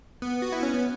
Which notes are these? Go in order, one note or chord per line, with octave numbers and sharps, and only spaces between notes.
B3
F#4
E4
C#4
B3